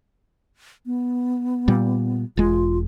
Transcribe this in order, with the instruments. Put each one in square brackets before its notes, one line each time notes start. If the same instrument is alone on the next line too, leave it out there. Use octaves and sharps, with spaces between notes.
[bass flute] B3
[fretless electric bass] A#2 G3
[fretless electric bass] E1 G#3 [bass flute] F4